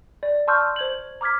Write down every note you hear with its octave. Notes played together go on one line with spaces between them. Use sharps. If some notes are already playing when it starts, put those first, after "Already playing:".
D5
A5 C6 C#6 E6 F6 G6
C5 G#6 F#7
A#5 D6 F6 G#6 B6